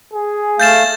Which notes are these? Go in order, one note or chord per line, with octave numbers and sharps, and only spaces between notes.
G#4
A3 F5 G6 A6 E7